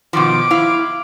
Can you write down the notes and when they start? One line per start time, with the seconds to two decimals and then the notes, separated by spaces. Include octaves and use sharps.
0.13 B2 D#3 F3 D6
0.51 E4 F5